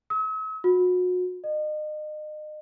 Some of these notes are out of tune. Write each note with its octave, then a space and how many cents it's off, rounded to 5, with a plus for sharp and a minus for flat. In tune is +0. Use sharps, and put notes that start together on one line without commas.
E6 -45
F#4 -35
D#5 -35